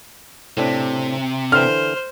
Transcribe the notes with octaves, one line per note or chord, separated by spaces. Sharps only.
A2 C3 C4 D4
D3 E3 C5 F6